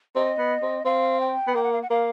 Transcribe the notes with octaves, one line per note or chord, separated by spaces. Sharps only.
C4 D#5
B3
C4
C4 F5
G5
B3
A#3 G5
F#5
F5
F#5
A#3 F5